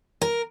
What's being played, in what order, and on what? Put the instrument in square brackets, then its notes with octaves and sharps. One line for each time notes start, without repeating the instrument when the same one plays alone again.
[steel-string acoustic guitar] A#4